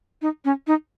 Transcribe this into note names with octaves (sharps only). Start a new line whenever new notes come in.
D#4
C#4
D#4